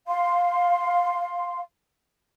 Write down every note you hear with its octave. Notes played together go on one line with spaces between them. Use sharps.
F5 C6